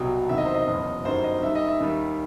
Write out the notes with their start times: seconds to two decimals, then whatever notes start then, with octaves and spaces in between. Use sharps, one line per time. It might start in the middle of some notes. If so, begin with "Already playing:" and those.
Already playing: C2 B2 F#3 G5
0.29 E2 C3 D#3 F#3 E5
0.38 D#5
0.45 C5
0.54 D#5
0.67 F#1 E2 B2 F#3
1.05 G1 F#2 D#3 G3 C5
1.24 D#5
1.43 D#2 D#3 G3 E5
1.55 D#5
1.68 E5
1.80 D#2 D#3 G3